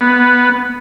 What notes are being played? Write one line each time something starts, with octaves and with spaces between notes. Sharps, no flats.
B3